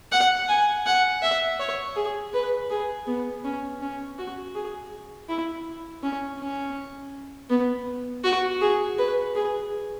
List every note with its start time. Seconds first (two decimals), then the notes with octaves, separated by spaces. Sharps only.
0.12 F#5
0.49 G#5
0.86 F#5
1.22 E5
1.60 C#5
1.96 G#4
2.34 B4
2.70 G#4
3.07 B3
3.45 C#4
3.81 C#4
4.18 F#4
4.55 G#4
5.29 E4
6.03 C#4
6.40 C#4
7.50 B3
8.24 F#4
8.61 G#4
8.99 B4
9.35 G#4